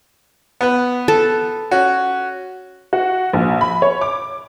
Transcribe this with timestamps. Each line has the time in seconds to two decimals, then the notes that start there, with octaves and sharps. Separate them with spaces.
0.61 B3 B4
1.08 A4
1.71 C#4 F#4
2.93 F#4
3.33 A#1
3.61 B5
3.82 C#5
4.01 D6